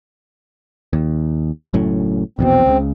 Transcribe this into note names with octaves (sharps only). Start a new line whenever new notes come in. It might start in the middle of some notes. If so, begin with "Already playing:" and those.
D#2
F#1 F#2 A2
A#1 E2 B2 C4
C#2 C#3